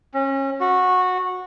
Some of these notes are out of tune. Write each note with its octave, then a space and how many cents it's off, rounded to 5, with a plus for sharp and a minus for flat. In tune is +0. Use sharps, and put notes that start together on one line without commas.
C#4 -30
F#4 -15